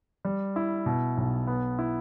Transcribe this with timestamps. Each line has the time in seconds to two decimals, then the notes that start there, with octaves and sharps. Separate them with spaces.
0.25 G3
0.56 E4
0.86 B2
1.17 B1
1.47 B3
1.79 E4